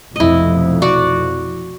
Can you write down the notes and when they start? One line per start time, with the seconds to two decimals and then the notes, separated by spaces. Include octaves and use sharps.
0.16 F1 B1 F2 E4 D#5
0.82 F#4 D5